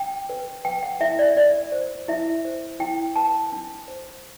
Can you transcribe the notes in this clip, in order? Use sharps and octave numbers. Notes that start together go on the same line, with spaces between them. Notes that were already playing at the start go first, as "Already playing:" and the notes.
Already playing: D4 G5
B4
B4 G5
F#5
E4 E5
D5
D4 D5
C5
E4 E5
C5
E4 G5
B4 A5
D4
C5